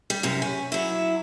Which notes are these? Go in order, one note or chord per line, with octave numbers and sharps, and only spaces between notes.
G3
F#2 C3
C#4
F#3 E4